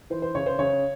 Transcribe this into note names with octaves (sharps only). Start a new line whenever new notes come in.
E3 C5
C5
C#3 C#5
C5
C#3 C#5